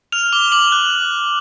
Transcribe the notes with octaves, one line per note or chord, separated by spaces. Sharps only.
F6 F7
D6 G7
D6 F#7
F#6